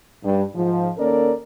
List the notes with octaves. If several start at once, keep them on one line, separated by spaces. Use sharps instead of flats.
G2
G#2 F3
D#2 A#3 C#4 A4 A#4 D5